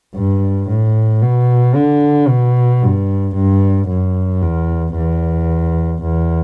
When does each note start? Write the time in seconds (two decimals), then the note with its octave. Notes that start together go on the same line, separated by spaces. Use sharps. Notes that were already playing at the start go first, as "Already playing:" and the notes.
0.16 G2
0.68 A2
1.22 B2
1.75 D3
2.29 B2
2.83 G2
3.36 G2
3.89 F#2
4.42 E2
4.96 E2
6.02 E2